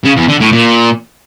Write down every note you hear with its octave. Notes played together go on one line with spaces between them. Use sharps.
C#3
E2
D3
A2
A#2